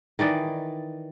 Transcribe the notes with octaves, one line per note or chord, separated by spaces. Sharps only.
D#3 E3 D5 D#5